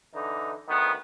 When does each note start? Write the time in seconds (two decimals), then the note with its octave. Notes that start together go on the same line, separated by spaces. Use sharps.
0.15 D3 E3 D#4
0.68 D2 D#3 B3